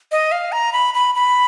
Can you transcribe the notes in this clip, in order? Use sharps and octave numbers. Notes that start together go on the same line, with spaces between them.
D#5
F5
A#5
B5
B5
B5